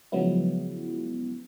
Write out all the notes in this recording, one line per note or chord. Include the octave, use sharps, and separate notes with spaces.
C#3 F3 F#3 G#3 B3 E4